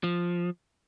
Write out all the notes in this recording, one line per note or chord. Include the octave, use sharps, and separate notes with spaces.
F3